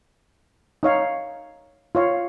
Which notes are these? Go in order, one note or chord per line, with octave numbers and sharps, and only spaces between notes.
D#4 C#5 F5
F4 C#5 F5